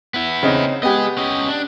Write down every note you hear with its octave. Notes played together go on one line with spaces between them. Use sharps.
B3 E4
C#3 C4 D#4
B3 G4 G#4 D#5
C#4 D#5
D4